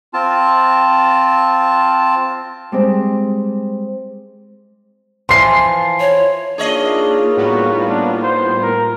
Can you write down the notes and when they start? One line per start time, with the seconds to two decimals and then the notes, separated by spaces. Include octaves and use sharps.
0.14 C4 F4 A5
2.72 G3 G#3 C4
5.29 E3 F3 C6 C7
6.00 C#5
6.58 A#3 D4 D#4 F4 G#4 C#5 D#5
7.37 A2 G3 B3 F#4
7.88 D4
8.23 C5
8.62 A#4